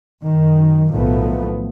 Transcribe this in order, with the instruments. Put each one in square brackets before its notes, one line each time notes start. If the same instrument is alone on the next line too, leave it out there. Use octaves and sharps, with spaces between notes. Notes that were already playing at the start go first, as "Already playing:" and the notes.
[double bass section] F#2 D#3
B1 A2 D#3 F3 A3 B3